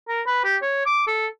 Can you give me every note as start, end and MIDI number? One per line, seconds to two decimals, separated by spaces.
0.09 0.22 70
0.27 0.43 71
0.44 0.56 67
0.62 0.85 73
0.86 1.05 86
1.07 1.27 69